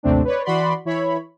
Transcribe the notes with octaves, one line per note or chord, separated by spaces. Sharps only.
A1 D#2 C3 A3 C4 D4
B4 C#5 D5
E3 F#4 D5 B5 C6
E3 E4 C#5 B5